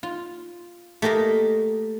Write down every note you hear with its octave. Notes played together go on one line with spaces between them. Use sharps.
F4
A3 A#3 G4 A#4 D#5